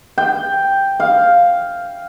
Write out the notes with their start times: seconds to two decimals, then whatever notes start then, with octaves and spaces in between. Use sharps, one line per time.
0.18 G5
1.00 F5